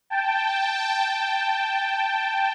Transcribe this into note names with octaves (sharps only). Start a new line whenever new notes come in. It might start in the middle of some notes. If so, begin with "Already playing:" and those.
G5 A5